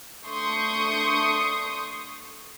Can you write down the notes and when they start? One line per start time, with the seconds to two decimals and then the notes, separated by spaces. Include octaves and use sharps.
0.24 A3 D4 C6 C#6 D#6 G6